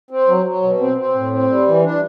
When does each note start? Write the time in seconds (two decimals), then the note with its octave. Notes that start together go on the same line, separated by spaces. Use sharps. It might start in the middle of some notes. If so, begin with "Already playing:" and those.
0.10 C4
0.28 F#3
0.46 F#3
0.63 B2
0.80 C4
0.97 C4
1.15 A2
1.32 C4
1.50 G3
1.67 E3
1.84 D4